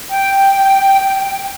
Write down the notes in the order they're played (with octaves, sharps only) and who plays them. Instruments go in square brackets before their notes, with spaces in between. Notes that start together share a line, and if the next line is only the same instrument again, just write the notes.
[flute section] G5